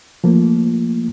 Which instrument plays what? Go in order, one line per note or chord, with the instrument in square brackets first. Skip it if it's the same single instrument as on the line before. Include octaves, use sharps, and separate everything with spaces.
[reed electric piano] F3 A3 A#3